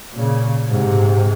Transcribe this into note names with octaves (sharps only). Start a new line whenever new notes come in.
A#2 C#3
G#2 C3